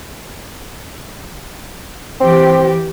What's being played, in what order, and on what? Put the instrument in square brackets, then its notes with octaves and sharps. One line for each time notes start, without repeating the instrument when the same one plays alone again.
[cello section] E3 G4 [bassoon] C4